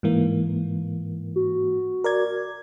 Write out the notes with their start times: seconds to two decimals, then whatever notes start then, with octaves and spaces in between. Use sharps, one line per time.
0.03 G#2 E3 A#3
1.36 F#4
2.04 A#4 D5 G#6